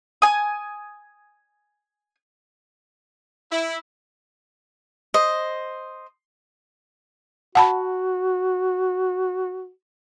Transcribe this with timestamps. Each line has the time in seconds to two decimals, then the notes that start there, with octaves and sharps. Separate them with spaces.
0.22 G#5 D#6
3.51 E4
5.14 C5 D#5
7.55 F#4 F#5 A5 B5